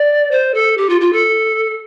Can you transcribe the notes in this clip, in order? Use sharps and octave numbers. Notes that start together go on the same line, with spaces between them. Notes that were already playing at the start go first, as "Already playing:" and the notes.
Already playing: D5
C5
A4
G4
F4
F4
A4